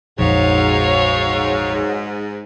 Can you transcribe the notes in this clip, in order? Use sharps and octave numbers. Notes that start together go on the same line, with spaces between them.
A#1 F2 G#2 F#3 F#4 C#5 F5